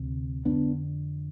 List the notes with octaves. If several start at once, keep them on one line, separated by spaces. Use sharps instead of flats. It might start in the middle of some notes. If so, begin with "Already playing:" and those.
Already playing: D2 C3
F2 D3 B3 D4